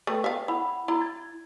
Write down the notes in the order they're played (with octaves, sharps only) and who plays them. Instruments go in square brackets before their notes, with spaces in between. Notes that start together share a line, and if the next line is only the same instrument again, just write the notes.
[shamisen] A3 [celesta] B4 G5
[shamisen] E5 F5
[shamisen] E4 [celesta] F#5 B5 F7
[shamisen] E4 [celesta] A#5
[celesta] G#6 A6